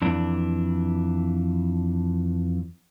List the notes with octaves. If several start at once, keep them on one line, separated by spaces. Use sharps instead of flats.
F2 E3 D4